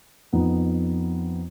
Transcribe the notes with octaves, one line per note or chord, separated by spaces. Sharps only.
F2 F3 B3 D#4